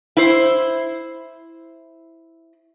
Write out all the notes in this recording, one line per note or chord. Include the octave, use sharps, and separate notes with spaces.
E4 C5